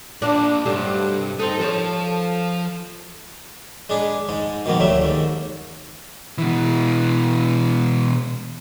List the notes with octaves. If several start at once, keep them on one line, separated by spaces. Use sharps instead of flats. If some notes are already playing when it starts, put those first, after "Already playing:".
F3 A#3 D4
G2 C3 F#3 A3
A3 C4 D#4
F3 A4 A#4 C#5
G#3 D4 G#4 B4
G#2 G#3
B2 D#3 F3 A#3 B3
D2 F#3 G3 A3 E5
D#2 G#2
B2 E3